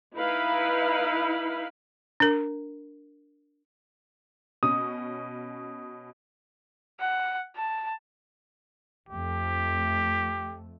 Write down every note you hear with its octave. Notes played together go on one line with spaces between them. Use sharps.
D#4 E4 B4 F5 B5
D4 A#4
B2 C#4 D#6
F#5
A5
F2 A3 G4